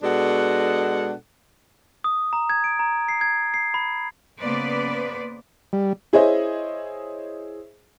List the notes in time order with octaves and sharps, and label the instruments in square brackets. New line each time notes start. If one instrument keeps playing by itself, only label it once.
[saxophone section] B2 G#3 D4 A4 F#5
[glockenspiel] D#6
A#5
G#6
D7
A#5
C7
G#6
C7
B5
[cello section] C#3 A#3 B3 B4 C5 D5
[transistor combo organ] G3
[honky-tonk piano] E4 G#4 C5 C#5 D#5 E5